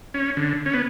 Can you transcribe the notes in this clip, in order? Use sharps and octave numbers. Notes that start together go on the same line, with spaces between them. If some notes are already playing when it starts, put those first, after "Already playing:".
C#4
D3
C#4
B3